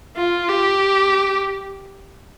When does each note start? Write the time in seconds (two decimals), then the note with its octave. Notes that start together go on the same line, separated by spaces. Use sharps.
0.16 F4
0.49 G4